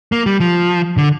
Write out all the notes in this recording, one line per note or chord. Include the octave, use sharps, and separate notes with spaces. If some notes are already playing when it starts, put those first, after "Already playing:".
A#3
G3
F3
D3